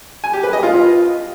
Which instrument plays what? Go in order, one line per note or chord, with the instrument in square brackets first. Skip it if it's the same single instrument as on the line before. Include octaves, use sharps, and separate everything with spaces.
[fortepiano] G#5
G4
B4
D#5
F4